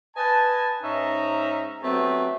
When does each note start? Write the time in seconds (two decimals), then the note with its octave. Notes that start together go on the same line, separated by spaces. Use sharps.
0.15 B4 D#5 G#5 A5
0.83 G#2 C#4 D#4 E5 A#5
1.82 F#3 A3 B3 C4 G4